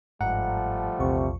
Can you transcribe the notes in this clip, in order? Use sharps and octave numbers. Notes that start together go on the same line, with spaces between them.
G1 G#2 F3 G3 A3 F#5 A#5
A#1 E2 C3 C#6